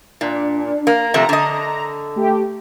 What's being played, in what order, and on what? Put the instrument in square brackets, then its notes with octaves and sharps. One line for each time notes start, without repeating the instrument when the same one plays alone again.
[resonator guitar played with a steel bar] A#2 [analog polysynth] D4
[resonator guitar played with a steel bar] A#3
[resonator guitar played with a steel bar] C3 F3 A3 [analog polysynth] A#5
[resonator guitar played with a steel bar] D3 D#5
[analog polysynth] A3 G4